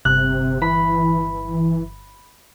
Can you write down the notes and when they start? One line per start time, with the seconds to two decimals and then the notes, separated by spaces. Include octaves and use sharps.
0.05 G1 C3 F#6
0.62 E3 B5